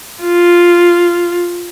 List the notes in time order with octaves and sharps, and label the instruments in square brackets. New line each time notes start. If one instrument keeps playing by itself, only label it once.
[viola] F4